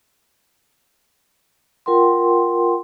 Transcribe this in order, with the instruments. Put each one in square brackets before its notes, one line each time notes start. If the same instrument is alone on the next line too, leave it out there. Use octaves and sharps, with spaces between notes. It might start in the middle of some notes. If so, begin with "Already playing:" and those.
[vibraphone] F4 A#4 F#5 G5 C6